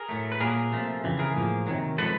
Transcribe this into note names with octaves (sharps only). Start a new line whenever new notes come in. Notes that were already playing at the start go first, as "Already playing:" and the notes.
Already playing: G#4 A#4
A2 F#3 A3
B4
A#2 F#3 A#3 G#4 A#4
C3 F3 A3
F2 C#3 E3
G#4 A#4
A2 F3 A#3
C3 D#3 F#3
C3 F3 G#3 A4 B4